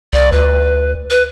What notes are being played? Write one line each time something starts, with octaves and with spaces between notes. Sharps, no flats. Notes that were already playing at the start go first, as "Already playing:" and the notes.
C2 D5
D2 B4
B4